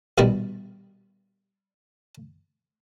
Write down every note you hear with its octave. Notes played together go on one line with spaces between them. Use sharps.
A#1 B2 D#3 G3 D#4